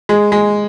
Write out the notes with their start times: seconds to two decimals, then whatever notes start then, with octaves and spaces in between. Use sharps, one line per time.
0.09 G#3
0.32 G#3